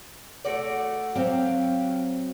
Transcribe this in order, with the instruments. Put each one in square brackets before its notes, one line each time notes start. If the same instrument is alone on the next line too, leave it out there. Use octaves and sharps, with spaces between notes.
[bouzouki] A3 F#4 D5
[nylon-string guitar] F#3 C4 [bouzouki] G4 F5